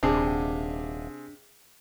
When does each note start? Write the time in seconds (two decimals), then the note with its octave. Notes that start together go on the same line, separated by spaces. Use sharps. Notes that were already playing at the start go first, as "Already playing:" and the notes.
0.03 D#1 C3 D4 G#4